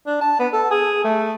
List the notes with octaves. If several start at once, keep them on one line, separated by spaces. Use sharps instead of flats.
D4
A5
B3
A4
G#4
A3